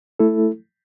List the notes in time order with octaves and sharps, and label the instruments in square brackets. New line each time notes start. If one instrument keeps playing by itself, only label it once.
[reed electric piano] A3 E4 A4